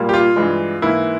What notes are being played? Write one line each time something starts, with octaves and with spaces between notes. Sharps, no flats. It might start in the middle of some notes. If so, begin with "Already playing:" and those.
Already playing: A#2 G3 A#3
G4
F4
G2 E3 G#3
G#2 E3 A#3 E4